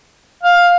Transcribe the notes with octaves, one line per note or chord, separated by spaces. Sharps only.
F5